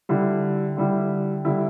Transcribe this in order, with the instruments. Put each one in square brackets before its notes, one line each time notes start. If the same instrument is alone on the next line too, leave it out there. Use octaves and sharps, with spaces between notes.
[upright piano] D3 G3 E4
D3 G3 E4
D3 G3 E4